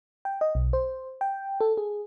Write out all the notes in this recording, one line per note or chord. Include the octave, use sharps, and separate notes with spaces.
G5
D#5
B1
C5
G5
A4
G#4